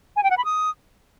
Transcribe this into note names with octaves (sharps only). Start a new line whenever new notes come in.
G#5
G5
F#5
B5
D#6